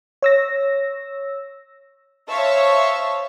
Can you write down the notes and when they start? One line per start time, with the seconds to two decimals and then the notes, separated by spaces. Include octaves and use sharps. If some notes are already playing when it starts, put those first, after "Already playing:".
0.22 C#5 E6 A#6
2.28 C5 C#5 E5 F5 A5 C#6